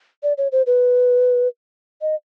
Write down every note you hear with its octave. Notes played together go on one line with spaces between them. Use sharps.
D5
C#5
C5
B4
D#5